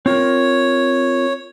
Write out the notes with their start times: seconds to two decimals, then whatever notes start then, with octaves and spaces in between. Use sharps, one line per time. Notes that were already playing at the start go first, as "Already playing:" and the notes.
0.06 C4 F4 A#4 C#5